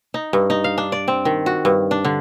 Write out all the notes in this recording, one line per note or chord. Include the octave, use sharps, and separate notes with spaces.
D#4
G2
D#4
F5
D4
D5
C4
D#3
F#4
G2
D4
D3